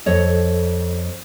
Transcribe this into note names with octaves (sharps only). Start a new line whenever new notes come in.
F2 A4 C#5 D#5